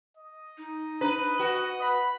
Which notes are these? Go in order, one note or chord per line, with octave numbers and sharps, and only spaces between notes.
D#5
D#4
D4 B4
F#4 B4
B5